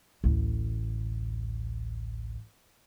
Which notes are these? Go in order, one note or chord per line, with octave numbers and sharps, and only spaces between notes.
A1 D2